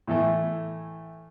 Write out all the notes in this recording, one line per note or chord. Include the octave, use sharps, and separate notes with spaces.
A2 E3 A3